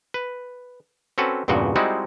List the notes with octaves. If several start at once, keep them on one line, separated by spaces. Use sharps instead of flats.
B4
C4 C#4 F#4 A4 B4
E2 G2 A#2 C#3 F#4
G3 G#3 C4 D#4 E4 F#4